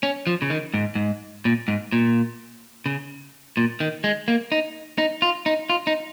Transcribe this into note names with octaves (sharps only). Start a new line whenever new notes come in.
C#4
F3
C#3
D#3
G#2
G#2
A#2
G#2
A#2
C#3
A#2
D#3
G#3
A#3
D#4
D#4
F4
D#4
F4
D#4